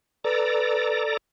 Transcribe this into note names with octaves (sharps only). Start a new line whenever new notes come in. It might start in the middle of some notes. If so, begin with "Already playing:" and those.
A4 B4 D5 A#5